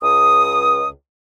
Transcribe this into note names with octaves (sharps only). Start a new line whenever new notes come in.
C#2 D#6